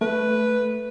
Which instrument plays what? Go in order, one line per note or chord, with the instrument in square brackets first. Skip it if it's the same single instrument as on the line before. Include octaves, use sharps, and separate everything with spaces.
[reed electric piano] A3 [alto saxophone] B4